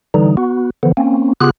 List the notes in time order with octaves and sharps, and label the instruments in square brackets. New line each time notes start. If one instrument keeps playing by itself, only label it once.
[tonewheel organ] D3 E3 G3 D#4
B3 F#4
D3 E3 F3 B3
A#3 C4 C#4
C#3 B3 F4 G4 G#4 F#6